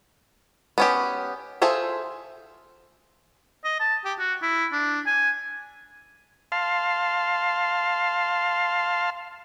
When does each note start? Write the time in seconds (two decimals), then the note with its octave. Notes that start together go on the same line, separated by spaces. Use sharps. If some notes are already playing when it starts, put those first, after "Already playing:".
0.78 B3 C#4 G4
1.62 F4 G#4 A4 C5 E5
3.64 D#5
3.80 A5
4.05 G4
4.19 F#4
4.42 E4
4.72 D4
5.06 G#5
6.52 F5 A5 C6